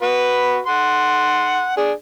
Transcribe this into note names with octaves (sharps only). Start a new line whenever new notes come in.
F#4 B4 B5
F#5 C6
D4 G#4